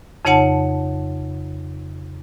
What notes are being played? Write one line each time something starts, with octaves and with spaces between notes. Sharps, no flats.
F2 C#3 D#4 C#5 F#5 A5